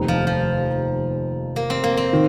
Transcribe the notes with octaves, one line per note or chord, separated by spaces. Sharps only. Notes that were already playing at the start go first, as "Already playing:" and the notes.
Already playing: F1 D#2 D#3 C4 D#4
F3
F3
A#3
C4
A#3
C4
D#3